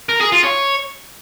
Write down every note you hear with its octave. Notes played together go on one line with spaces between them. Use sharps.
A#4
G#4
F4
C#5